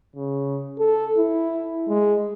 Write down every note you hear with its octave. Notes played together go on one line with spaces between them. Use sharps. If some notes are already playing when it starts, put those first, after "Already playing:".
C#3
A4
E4
G#3